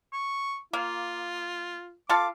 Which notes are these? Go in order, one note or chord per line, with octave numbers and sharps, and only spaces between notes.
C#6
A#3 F4
F4 A4 F5 D6